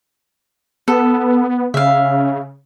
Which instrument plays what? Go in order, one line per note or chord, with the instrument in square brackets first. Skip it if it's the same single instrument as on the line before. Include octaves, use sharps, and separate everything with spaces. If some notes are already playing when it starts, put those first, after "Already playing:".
[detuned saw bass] B3 [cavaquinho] A4
[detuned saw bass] C#3 [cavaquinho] E5 F5